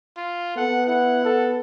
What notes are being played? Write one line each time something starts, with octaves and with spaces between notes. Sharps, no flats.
F4
B3 A4 F#5
E4 F#5
A4